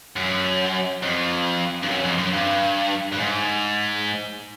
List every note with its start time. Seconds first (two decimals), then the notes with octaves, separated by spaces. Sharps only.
0.16 F#2
1.03 F2
1.83 G2
1.89 F#2
2.03 F2
2.18 F#2
2.32 G2
3.12 G2
3.19 G#2